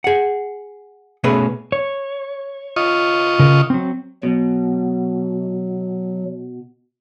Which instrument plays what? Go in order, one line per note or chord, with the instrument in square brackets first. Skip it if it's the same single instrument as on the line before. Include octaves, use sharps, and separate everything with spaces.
[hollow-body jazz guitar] G#4 F#5
B2 A3 B3 C#4 G#4 B4
[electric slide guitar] C#5
[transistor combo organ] F4 D#5 C#6
[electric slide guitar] C#3 A#4
F#3 C4
[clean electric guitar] B2 [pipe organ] F#3